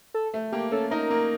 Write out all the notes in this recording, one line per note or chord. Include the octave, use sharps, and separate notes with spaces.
A4
A3
A#3 G4
C#4 A4
D#4 A#4
A#3